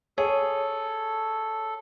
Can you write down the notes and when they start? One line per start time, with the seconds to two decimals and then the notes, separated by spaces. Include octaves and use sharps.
0.18 G#4 A4 C#5